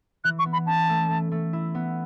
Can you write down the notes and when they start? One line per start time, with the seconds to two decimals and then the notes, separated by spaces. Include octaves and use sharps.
0.24 E3 F#6
0.39 C#6
0.45 B3
0.53 B5
0.66 C#4 A5
0.89 A3
1.10 A3
1.31 A3
1.53 E4
1.75 B3